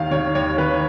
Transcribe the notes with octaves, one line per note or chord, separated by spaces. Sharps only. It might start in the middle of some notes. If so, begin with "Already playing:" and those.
Already playing: D#2 D#3 F5
D#3 C#5
D#2 C#5
D#3 B4